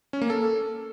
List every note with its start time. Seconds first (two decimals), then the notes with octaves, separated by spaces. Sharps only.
0.13 C#4
0.22 A#3
0.30 A4